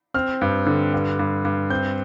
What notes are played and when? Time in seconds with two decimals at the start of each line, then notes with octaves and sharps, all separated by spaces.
0.14 C4 F6
0.41 G2
0.66 D3
0.93 G2
1.19 G2
1.45 G2
1.70 C4 G6